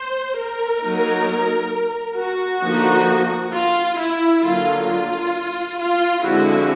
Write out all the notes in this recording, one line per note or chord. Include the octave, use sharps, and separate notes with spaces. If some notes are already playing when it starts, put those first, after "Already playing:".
Already playing: C5
A#4
F#3 A#3 D#4
F#4
D3 F3 A#3 D#4
F4
E4
D3 F#3 A#3 F4
F4
F4
D3 F3 G#3 C4 E4 F#4